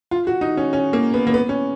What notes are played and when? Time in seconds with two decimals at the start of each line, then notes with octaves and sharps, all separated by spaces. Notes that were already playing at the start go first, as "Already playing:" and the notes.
0.11 F4
0.27 F#4
0.41 D#4
0.57 C#4
0.73 C#4
0.93 A#3
1.14 B3
1.27 A#3
1.34 B3
1.49 C#4